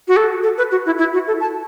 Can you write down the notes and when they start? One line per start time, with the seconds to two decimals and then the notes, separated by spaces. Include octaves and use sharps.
0.08 F#4
0.17 A4
0.43 A4
0.58 B4
0.71 F#4
0.86 E4
0.98 E4
1.13 F#4
1.27 A4
1.40 A5